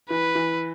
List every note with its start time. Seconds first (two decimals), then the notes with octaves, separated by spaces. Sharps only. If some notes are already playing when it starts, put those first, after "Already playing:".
0.10 E3 B4
0.35 E3